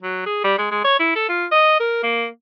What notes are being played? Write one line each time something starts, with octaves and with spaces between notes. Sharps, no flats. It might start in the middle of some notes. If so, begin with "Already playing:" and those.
F#3
G#4
G3
G#3
G#3
C#5
E4
A4
F4
D#5
A#4
A#3